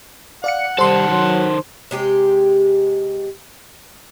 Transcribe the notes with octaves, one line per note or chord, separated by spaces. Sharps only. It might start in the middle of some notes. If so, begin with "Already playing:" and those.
D5 F5 F#5 C#7
D#3 G3 A4 C5 C6
F#3
C3 G#3 G4